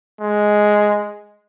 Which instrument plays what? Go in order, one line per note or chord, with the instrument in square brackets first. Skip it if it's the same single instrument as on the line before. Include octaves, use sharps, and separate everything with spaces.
[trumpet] G#3